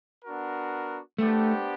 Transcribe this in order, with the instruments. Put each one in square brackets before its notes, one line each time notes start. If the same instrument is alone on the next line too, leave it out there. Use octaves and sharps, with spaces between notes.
[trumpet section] B3 D4 F#4 A#4
[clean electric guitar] A3 [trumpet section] B3 D4 G4 C5